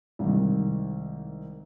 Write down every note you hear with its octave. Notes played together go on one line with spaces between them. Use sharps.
C2 G#2 D#3